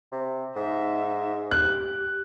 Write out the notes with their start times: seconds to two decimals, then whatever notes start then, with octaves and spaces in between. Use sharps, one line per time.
0.12 C3
0.56 G#2 D#4 E5
1.51 G4 F#6